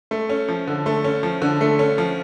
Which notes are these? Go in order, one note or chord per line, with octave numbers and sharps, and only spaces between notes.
A3
C#4
F3
D3
A3
C#4
F3
D3
A3
C#4
F3